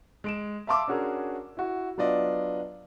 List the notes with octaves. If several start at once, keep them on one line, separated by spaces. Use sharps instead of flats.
G#3 D7 E7
E5 F5 A5 C6 D6 E6
C#4 D4 F#4 G#4 A#4
E4 F#4
F#3 B3 D4 F4 D5 D#5